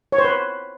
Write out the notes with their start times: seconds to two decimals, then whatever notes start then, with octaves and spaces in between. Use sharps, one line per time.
0.12 C#5
0.18 C5
0.24 B4